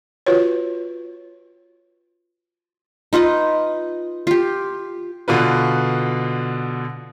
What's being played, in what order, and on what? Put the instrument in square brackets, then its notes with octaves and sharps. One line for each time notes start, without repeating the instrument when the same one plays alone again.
[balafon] F4 F#4 B4 C#5
[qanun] D#4 F4 B4 D#5
F4 G4
[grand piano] B2 D3 F4 B4